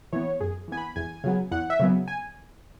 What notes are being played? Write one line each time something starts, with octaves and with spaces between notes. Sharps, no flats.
E3 B3 C#5
F#2 G#4
E3 B3 G#5
B5
E2 G#5
C#3 F#3 B3
E2 F#5
E5
C#3 F#3 B3
G#5